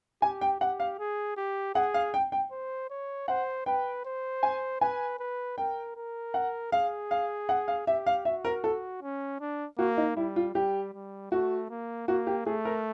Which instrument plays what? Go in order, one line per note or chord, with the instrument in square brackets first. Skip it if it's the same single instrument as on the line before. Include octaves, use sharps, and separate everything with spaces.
[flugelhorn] G4 [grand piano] G#5
[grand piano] G5
[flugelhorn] G4 [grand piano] F#5
[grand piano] F5
[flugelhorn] G#4
G4
[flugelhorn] G#4 [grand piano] F#5
[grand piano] F5
G5
G5
[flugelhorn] C5
C#5
[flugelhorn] C5 [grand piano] F#5
[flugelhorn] B4 [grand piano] G5
[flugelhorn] C5
[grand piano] G#5
[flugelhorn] B4 [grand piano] G#5
[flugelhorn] B4
[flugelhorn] A#4 [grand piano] G5
[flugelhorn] A#4
[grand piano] F#5
[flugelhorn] G#4 [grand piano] F5
[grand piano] F5
F#5
F5
[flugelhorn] G4 [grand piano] E5
[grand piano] F5
[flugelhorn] F#4 [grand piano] E5
[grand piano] A#4
A4
[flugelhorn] C#4
D4
[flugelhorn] A#3 [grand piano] F#4
[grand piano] D#4
[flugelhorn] G3 [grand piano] E4
[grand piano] F4
[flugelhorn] G3 [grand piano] G4
[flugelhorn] G3
[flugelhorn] A3 [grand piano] F#4
[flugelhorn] A#3
[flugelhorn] A#3 [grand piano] F#4
[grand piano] G4
[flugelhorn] A3 [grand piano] G#4
[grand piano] A#4